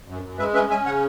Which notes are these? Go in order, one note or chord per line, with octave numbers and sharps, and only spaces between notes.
F#2
F#2
G#3 B4 E5
C#4 B4 E5
C#4 E5 G#5
C#3 C#5 F#5